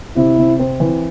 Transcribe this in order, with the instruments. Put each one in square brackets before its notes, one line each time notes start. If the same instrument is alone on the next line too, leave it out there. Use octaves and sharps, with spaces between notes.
[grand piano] C3 [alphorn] E4
[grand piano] C3
C4
E3